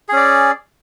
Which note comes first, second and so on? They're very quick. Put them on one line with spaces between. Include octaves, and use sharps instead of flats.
G#4 C#4 D5